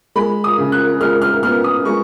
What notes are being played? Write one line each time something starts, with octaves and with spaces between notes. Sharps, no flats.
G#3 B5
D#6
C#3
F#6
G#3 F6
F6
B3 F6
D#6
G#3 C#6